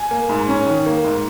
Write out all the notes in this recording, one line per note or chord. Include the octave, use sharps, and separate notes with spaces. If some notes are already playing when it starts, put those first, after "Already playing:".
Already playing: G#5
A#3
G#2
C#4
D#3
A#3
G#2